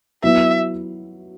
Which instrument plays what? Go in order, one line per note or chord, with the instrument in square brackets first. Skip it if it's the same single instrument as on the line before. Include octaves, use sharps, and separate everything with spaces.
[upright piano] F#3 B3 E4 [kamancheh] E5